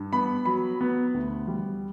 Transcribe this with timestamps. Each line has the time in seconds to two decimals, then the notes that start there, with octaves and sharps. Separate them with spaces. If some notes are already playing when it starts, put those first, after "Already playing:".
Already playing: G2
0.13 B3 B5
0.45 F#3 B5
0.81 B3
1.14 D2
1.48 G3